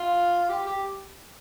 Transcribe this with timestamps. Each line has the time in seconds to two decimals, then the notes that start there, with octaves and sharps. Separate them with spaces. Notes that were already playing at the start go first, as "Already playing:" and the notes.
Already playing: F4
0.49 G4
0.67 G4